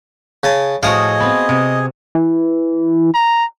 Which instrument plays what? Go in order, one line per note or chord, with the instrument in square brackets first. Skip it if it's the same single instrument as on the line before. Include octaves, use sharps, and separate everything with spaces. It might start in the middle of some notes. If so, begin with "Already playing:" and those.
[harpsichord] C#3 G#5 A5
[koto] A2 F3 F#4 [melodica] G#4 [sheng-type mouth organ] D#5 [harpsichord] F5 D#6
[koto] B3 C4
C3
[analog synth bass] E3
[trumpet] A#5